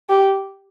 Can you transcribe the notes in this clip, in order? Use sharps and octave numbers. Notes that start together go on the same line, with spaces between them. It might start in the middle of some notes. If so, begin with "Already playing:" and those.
G4